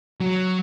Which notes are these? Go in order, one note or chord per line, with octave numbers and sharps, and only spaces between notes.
F#3